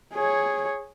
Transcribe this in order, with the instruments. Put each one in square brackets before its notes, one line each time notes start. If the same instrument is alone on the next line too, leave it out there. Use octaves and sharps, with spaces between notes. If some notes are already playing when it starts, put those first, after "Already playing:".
[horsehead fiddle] G#4 C#5